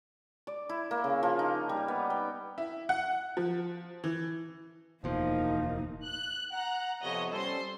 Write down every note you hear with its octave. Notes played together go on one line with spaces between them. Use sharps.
D5
E4
A#3
C#3
F3
D#4
G3
B3
G5
E4
F#5
F3
E3
D1 E2 B2 F3 A#3 D#4
F#6
F#5 A#5 F#6
F2 C3 B3 C#5 D#5
G3 C#4 A4 C5 C6